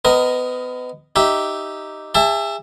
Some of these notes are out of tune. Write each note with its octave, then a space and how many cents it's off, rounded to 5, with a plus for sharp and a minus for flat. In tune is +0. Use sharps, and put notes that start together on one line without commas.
B3 +30 A#4 +0 D#5 +0
D#4 -5 G4 -10 E5 +0
G#4 -40 E5 +20 A5 +0